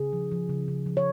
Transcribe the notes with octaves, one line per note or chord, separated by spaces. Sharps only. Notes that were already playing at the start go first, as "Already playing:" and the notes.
Already playing: C#3 G#4
F3
F3
C#3
C#3
F3
C#5